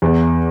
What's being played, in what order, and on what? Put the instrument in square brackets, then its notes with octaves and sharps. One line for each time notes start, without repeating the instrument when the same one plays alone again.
[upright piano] E2